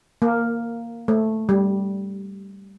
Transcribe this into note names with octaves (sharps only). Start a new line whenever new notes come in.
A#3
A3
G3